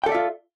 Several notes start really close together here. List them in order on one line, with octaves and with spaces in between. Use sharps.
G5 A4 D5 E5 F4